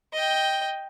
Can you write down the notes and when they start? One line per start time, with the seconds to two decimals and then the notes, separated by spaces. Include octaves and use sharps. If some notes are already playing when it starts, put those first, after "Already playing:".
0.13 D#5 G5